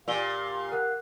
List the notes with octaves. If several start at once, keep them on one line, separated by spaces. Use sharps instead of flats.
A#2 G4 F5 E6 G7
A#4 F#5 F#6